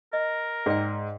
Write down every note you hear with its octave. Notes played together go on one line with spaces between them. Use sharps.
A#4 D#5
G#2 D5 G5